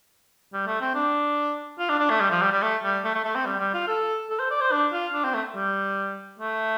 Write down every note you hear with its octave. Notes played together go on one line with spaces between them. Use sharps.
G3
A3
C4
D4
F4
D4
D4
A3
G3
F3
G3
G3
A3
G3
A3
A3
A3
C4
G3
G3
F4
A4
A4
C5
D5
C5
D4
F4
D4
C4
A3
G3
A3